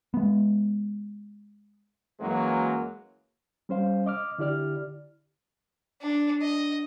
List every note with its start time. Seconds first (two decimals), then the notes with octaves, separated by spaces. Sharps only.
0.14 G#3 B3
2.20 F#2 E3 F#3 G#3 A#3
3.69 G3 C#4 C5 F5
4.06 D#5 D6 F6
4.38 D3 E4 G4 D5 F6
6.01 D4
6.41 D#5